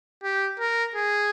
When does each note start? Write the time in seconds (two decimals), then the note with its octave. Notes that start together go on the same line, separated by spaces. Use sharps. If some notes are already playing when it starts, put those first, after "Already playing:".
0.23 G4
0.59 A#4
0.95 G#4